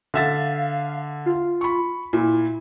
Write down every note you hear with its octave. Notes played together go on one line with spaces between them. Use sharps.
D3 E5 F5 A6
F4
B5 C#6
A#2 E4